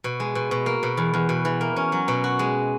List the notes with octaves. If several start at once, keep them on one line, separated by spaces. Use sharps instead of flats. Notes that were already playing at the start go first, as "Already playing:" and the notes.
B2
G#3
B2
B2
A#3
B2
E2
E2
B2
E3
A#3
C#4
F#3
B2
F#4
G#3